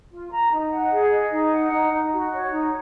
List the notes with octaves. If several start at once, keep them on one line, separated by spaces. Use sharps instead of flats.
F4
A#5
D#4
F#5
G#4
D#5
D#4
F#5
D#4
D#4
F#4
C#5
D#4